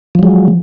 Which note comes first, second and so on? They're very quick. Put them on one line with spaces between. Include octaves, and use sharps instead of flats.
F3 F#3 G#3